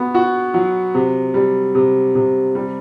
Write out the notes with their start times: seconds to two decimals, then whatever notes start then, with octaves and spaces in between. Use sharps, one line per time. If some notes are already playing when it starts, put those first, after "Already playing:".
Already playing: B3 F#4
0.14 F#4
0.54 F#3
0.94 C3
1.34 G3
1.75 C3
2.15 C3
2.55 G3